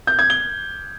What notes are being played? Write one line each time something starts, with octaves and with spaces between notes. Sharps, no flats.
G6
G#6
G7